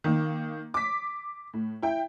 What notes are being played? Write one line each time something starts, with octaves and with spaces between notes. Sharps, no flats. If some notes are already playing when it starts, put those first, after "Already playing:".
D#3 A#3
D6 B6
A2
E4 G5